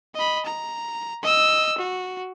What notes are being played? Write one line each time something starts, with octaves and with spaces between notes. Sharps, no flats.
D#5 B5
A#5
D#5 E6
F#4